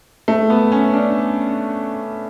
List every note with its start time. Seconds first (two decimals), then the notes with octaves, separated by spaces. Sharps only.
0.28 A3
0.50 B3
0.72 C#4
0.93 D4